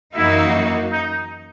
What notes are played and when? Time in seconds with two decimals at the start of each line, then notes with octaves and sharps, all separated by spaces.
0.15 F#2 E3 A#3 D#4 E4 F#4
0.92 D#4